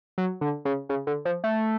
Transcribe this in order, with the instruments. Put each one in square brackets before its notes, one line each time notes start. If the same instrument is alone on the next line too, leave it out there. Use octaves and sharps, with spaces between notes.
[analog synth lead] F#3
D3
C#3
C#3
D3
F3
A3